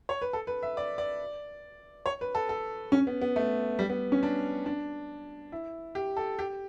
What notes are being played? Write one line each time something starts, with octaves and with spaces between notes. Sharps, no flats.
C#5
B4
A4
B4
E5
D5
D5
C#5
B4
A4
A4
C#4
B3
B3
A3
G3
B3
C#4
D4
D4
E4
G4
A4
G4